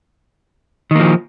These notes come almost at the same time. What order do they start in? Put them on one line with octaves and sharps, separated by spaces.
D#3 A#3 F3